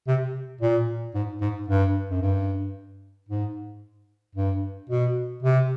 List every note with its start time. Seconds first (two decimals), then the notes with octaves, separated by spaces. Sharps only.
0.08 C3
0.61 A#2
1.14 G#2
1.41 G#2
1.68 G2
2.11 F#2
2.22 G2
3.29 G#2
4.36 G2
4.90 B2
5.43 C3